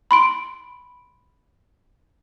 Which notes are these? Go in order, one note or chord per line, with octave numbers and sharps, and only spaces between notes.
B5 C6 D7